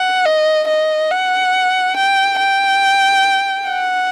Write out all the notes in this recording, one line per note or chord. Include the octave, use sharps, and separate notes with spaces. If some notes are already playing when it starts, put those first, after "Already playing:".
Already playing: F#5
D#5
D#5
F#5
G5
G5
F#5